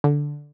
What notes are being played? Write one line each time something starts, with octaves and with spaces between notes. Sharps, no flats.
D3